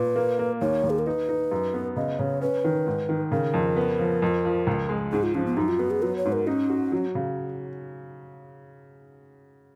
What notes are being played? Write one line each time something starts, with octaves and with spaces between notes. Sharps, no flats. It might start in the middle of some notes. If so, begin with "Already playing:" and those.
Already playing: A#2 B4
A#3
A#3
D#2 C#5
D#2
G#4
A#4
D#4 B4
D#4
F#2
B3
C#3 D#5
C#3 C#5
C#4 B4
D#3
G#2
D#3
C#3 A#4
F2
B3
F3
F2
F3
C#2
G#3
G#2 G#4
F4
F3 C#4
B3
F#2 D#4
F4
B3 F#4
G#4
F#3 B4
C#5
G#2
A#4
C#4 D#4
F#4
F#3
C#3